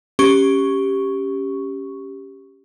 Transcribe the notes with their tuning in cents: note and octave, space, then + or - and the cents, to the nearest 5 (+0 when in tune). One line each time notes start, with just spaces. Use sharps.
C#4 +0 G4 +0 C#6 +0